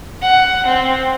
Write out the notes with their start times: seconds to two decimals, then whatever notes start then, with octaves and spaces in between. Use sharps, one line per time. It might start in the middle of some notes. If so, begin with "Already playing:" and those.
0.22 F#5
0.66 C4